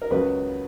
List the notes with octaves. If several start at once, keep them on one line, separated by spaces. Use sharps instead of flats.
A#4
C#2 C#3 F#3 B4